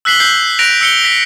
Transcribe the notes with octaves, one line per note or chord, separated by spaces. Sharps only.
E6 F#6 B6 C7 F#7 G7
E6 G6 C7
F#6 A#6 D7 F7
E6 C#7 G7
B6 F7